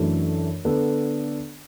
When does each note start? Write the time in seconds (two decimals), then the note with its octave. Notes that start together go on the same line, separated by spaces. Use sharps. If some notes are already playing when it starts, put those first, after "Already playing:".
Already playing: F#2 E3 A3 D4
0.65 D3 B3 D4 A4